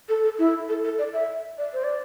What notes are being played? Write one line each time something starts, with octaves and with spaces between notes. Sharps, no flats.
A4
A4
E4
A4
A4
D5
E5
D5
C5
D5